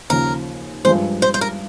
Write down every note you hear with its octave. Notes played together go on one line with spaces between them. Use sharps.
D#2 C#3 F3 A#4
G2 F3 G#3 C5
C5
C5
A#4